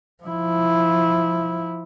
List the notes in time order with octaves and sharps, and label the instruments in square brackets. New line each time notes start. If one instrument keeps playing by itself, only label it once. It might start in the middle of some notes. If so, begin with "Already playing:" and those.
[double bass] F3 E4